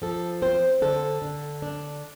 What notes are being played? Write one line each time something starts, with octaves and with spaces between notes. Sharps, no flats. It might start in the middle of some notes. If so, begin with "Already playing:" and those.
F3 A4
C4 C5
D3 A4
D3
D4